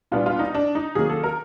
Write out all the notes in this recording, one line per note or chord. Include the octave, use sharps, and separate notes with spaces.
A#2 G3 B3 D4 F4
F4
D#4
D4
D#4
D#3 F#3 A#3 C#4 G#4
A4
A#4